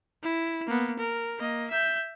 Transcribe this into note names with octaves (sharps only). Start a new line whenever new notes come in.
E4
A#3 B3
A#4
A#3 D#5
E5 G6